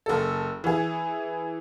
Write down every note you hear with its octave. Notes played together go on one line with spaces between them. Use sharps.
F#1 A4
E3 G#4